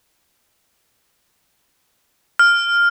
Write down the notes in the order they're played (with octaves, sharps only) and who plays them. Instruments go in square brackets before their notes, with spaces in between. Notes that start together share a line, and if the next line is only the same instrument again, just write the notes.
[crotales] F6